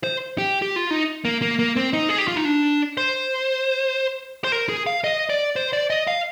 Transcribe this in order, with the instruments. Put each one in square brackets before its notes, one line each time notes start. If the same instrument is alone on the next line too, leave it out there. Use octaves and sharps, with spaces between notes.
[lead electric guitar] C5
G4
G4
F4
D#4
A#3
A#3
A#3
C4
D#4
G#4
G4
F4
D#4
D4
C5
C5
A#4
G#4
F5
D#5
D5
C5
D5
D#5
F5